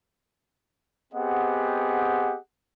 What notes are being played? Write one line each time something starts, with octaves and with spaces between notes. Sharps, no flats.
B3 C4 G4 G#4 D#5 F#5